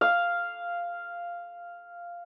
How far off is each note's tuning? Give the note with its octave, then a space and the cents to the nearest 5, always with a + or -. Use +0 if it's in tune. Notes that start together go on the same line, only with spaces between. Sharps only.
F5 -5